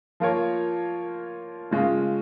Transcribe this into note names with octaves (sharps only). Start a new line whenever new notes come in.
F3 A#3 F4 A#4 C#5
C#3 G#3 C#4 F4